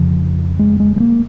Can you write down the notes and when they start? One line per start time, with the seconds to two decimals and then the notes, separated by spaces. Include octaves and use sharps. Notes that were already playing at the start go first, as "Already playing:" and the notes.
Already playing: F2 C#3 F3
0.59 G#3
0.80 G#3
0.96 G#3
1.00 A#3